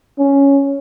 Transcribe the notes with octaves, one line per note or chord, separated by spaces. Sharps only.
C#4